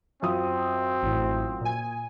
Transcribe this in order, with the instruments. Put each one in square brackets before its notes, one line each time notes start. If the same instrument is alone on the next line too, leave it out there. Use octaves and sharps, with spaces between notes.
[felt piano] F#2 F4 D#6 [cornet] C4
[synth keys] A1 A2
A#2 G#5